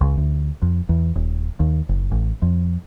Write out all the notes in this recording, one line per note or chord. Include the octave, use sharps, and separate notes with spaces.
C#2
D2
F2
E2
D#1
D#2
F#1
A1
F2